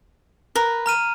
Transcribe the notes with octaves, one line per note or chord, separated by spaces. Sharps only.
A#4 B4
A#5 F6 D#7